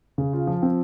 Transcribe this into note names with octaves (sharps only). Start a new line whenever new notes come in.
C#3
F4
F3
C4